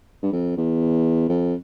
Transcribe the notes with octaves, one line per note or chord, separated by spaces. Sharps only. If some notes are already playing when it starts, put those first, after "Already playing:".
G2
F2
E2
F2